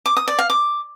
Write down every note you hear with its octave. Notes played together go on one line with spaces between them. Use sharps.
D6
D#6
D5
F5
D6